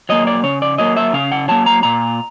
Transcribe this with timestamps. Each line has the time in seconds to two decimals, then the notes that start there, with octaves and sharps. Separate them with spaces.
0.09 F#3 A#3 D#5
0.27 D5
0.43 C#3 C#5
0.62 D5
0.78 F#3 A#3 D#5
0.97 E5
1.13 C#3 F5
1.32 F#5
1.48 F#3 A#3 A5
1.66 A#5
1.83 A#2 A#5